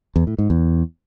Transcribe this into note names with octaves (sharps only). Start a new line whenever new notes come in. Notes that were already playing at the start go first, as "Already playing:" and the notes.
E2
A2
G#2
E2